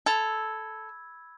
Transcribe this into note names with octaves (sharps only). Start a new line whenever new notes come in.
A4 B5 E6 G#6